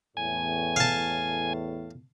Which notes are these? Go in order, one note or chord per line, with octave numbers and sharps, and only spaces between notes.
E2 A2 G#5
F5 A5